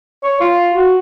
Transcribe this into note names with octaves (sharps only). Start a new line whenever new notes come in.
C#5
F4
F#4